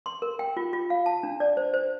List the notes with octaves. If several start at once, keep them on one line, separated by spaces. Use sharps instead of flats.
C6
A#4
G5
F4
F4
F5
A5
D4
D5
C5
C5